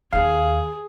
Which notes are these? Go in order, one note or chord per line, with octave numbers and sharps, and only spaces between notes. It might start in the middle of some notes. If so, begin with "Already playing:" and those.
D#2 D4 G#4 F5